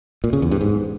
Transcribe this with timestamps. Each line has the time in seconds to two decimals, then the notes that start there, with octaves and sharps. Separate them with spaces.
0.24 A#2
0.33 C#3
0.42 E2
0.51 G2
0.61 G#2